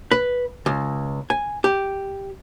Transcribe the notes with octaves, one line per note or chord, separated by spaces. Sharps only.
B4
C#2
G#5
G4